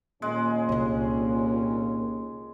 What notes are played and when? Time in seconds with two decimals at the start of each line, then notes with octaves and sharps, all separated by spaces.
0.22 D#2 A#2 G#3 C#4
0.69 C2 D4